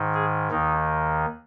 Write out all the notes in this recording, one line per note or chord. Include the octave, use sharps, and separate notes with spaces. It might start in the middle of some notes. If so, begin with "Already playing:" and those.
Already playing: G#2 D#3
G#4
D#2 D#3 D#4